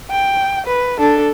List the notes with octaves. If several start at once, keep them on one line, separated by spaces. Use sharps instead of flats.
G5
B4
D4 A4